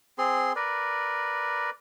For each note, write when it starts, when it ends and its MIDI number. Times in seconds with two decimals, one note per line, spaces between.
0.18 0.53 60
0.18 0.53 68
0.18 0.53 84
0.56 1.70 70
0.56 1.70 71
0.56 1.70 74